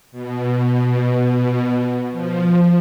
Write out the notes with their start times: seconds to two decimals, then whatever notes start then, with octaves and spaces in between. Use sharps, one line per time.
0.12 B2
2.11 F3